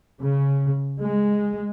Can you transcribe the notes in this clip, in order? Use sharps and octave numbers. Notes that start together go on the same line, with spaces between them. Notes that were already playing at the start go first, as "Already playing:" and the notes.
C#3
G#3